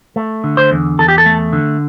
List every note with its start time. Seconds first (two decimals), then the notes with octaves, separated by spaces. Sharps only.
0.16 A3
0.44 D3
0.57 C5
0.71 E2
0.99 E2 A4
1.08 G4
1.18 A4
1.26 A3
1.53 D3